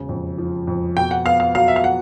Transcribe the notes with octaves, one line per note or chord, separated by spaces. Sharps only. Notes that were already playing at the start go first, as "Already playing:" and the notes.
Already playing: E1 C#3
F2
F3
F2
B2 G5
F#5
B3 F5
F5
F#3 F5
E5
F5
F#5